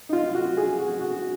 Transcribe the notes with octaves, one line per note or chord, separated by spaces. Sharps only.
D#4
F4
F#4
G#4
F#4
F#4